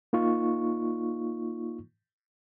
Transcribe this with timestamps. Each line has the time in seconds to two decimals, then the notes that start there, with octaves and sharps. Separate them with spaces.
0.13 A#3 D#4 F4 C#6